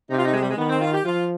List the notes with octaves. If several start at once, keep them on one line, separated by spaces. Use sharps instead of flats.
C3 D#4
F4
D#4
G#3
G3
G#3
D#3 B3
C4
F4
G4
F3 F4